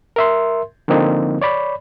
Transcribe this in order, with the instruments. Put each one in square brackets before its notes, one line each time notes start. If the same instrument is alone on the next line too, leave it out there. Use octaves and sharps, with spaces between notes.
[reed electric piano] A#4 E5 C6
D3 F3 A#3 C4 D#4
C#5 D5 B5